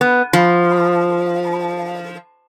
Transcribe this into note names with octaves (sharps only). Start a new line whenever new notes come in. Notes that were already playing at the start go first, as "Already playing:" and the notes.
B3
F3